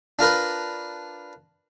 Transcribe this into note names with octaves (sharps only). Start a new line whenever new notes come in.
D4 F4 A#4 B4